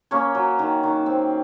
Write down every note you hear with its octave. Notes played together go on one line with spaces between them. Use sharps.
A#3 C#4 C#5
F#3
D#3
D#3
C4